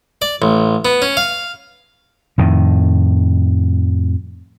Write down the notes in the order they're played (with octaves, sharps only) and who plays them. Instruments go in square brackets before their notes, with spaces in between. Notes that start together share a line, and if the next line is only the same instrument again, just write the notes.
[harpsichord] D5
A1
B3
C#4
F5
[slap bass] F2 A2 D#3